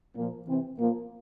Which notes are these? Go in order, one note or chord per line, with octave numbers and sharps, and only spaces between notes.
A#2 F3 A#3
C3 E3 C4
A#2 F3 A#3